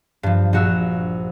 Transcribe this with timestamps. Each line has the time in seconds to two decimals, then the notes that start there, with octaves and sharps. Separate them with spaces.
0.23 G2 F3
0.53 A#1 F#4 E6